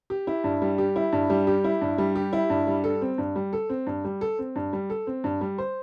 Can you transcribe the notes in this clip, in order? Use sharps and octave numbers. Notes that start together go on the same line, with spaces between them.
G4
E4
G2
G3
G4
E4
G2
G3
G4
E4
G2
G3
G4
E4
G2
G3
A4
C4
G2
G3
A4
C4
G2
G3
A4
C4
G2
G3
A4
C4
G2
G3
C5